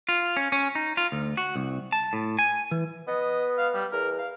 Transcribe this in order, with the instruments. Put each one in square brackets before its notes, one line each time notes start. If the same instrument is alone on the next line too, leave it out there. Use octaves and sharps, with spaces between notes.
[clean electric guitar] F4
C#4
C#4
D#4
F4
D2
F#4
C2
A5
A2
G#5
E3
[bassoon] B3 [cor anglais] D#5
[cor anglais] F5
G3
[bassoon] E2 [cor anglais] A#4
[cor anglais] F5